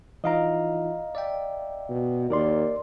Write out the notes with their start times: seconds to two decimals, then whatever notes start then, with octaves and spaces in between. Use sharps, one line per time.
0.24 E3 D#4 F4 D#5 F5 A#5
1.15 D5 E5 G5
1.90 B2
2.30 D#2 A#4 D5 C6